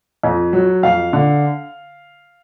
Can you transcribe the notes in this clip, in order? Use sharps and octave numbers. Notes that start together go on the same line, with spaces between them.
F2
F#3
F2 F5
D3